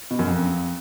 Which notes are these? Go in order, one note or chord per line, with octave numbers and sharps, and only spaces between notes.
B2
F#2
F2